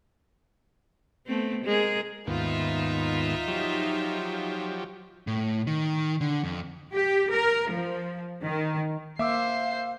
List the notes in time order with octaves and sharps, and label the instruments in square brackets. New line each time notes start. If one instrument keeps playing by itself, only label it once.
[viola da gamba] A3 B3 C4
G#3 G#4 A#4
[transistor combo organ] D#2 G#2 B3 [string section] D#4 F4 E5
[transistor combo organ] F3 F#3 G4
[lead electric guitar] A2
D#3
D3
F2
[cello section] G4
A#4
F3
D#3
[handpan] A#3 [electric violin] C5 C7 [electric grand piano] E5 D6 E6 [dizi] F5